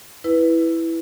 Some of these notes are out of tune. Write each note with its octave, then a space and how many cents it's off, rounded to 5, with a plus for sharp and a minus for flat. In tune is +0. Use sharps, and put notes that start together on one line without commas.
E4 +0 B4 +0